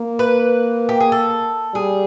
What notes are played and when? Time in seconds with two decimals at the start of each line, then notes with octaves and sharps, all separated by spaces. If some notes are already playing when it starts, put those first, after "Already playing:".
Already playing: A#3
0.19 B4
0.89 G4
1.00 G#4
1.12 A4
1.74 G3 G#4